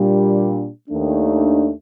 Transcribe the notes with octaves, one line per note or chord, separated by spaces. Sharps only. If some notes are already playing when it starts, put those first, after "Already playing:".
Already playing: A#2 G3 D4
D#2 D#3 A3 D4